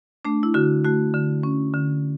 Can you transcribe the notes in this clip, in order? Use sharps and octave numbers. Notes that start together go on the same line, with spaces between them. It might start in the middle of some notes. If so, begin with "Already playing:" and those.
A3 D4
E4
D3 F#4
A3 F#4
D3
C#4
D3